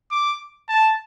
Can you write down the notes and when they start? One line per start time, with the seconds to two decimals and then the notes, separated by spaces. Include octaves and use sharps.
0.11 D6
0.69 A5